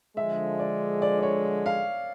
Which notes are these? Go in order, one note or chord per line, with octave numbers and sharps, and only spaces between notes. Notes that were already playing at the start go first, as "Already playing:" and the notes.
D3 F3 G#3 E5
D5
D5
D5
C#5
F5